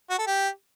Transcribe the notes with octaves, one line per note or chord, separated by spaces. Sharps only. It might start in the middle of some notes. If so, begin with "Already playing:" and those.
F#4
A4
G4